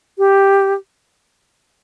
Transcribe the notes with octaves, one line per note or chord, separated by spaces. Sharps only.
G4